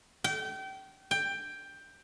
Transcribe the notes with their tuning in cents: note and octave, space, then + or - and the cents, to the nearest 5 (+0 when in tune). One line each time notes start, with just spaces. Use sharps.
G5 -30
G5 +10